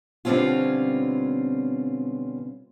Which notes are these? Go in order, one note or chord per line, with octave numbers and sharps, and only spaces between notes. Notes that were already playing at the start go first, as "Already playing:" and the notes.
B2 D3 G3 C4 C#4 F4